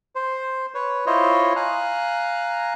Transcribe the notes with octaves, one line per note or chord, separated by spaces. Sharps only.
C5
B4 C#5
E4 F4 C5 C#5 D#5
F5 G#5 A#5 F#6